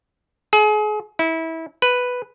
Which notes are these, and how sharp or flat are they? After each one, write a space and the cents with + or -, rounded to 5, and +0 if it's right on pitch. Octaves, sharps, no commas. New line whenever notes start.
G#4 +35
E4 -25
B4 +0